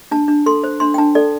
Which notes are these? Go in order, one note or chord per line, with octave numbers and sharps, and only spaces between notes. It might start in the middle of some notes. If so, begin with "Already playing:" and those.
D4 A5
D4
A4 C6
C5
D4 C6
G5
D4 A5
A4 D5